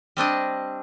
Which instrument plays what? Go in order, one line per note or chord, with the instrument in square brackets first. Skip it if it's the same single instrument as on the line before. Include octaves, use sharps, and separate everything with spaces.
[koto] G3 C4 D4 D#5